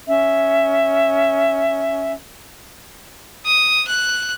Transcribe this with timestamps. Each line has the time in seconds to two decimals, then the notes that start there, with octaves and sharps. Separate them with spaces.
0.07 C#4 E5
3.45 D#6
3.87 F#6